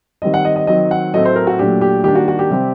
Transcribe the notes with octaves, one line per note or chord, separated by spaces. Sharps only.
D#3 G3 C4 D#5
F#5
D#5
D#5
D#3 F#3 C4 D#5
F#5
A2 F#3 A3 C4 D#5
C5
A#4
F#4
A#2 F#3 A3 D4 G4
G4
D#3 G3 A#3 D4 G4
F#4
F#4
G4
C3 G3 C4